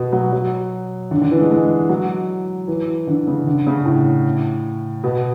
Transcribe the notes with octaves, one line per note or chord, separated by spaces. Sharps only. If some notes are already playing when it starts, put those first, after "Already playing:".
Already playing: B2
F#3
F#3
D3
D3
E3
G#3
G#3
F#3
E3
D3
C#3
D3
C#3
A2
B2